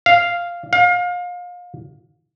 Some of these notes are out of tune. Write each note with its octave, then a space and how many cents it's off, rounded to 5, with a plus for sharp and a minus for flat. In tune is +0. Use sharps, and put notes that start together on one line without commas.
F5 -5
F5 +30